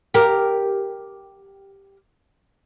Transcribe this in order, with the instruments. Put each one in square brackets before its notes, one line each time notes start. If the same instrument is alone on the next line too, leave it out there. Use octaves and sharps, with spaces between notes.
[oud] G4 A#4